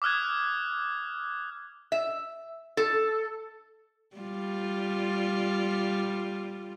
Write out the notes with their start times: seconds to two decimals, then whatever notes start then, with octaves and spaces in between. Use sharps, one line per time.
0.02 D6 D#6 F6 F#6 G#6
1.92 E5
2.77 A4
4.16 G3 F4